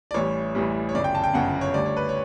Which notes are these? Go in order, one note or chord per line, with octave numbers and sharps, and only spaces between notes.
D5
A1 A2 E3 G3 C#5
A1 A2 E3 G3
C#5
G1 F#2 C#3 D5
G5
A5
G5
G1 F#2 C#3 F#5
C#5
D2 D3 G3 D5
C#5
B4
C#5